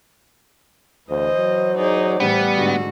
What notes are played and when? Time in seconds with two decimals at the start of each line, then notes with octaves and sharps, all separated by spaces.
1.10 D2 E3 C5 D#5
1.38 F#3
1.77 D#4 G#4 D5
2.20 A2 E3 G3 B3
2.56 G#2 D3 F#4